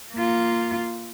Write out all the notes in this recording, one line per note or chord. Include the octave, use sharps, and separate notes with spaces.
A#3 F4